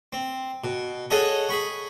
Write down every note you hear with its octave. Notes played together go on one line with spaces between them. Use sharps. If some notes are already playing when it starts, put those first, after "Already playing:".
C4
B2
G#4 A4 C#5 D#5 F#5 G#5
G#4 B5 C#6